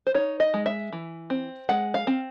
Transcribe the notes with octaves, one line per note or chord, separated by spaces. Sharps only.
C5
D#4 C#5
D#5
G#3
E5
E3
C4
G#3 F#5
F5
C4